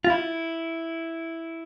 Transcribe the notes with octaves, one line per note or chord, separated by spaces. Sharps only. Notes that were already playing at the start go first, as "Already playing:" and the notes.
F4
E4